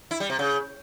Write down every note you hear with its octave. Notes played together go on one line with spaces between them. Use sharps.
E4
G3
C3
C#3